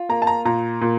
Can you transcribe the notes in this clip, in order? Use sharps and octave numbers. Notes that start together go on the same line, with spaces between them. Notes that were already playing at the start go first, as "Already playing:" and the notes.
Already playing: F4
A#3 A#5
A5
A#5
A#2 A#5
A#2